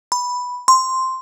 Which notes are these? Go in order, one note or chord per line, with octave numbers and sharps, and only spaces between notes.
B5
C6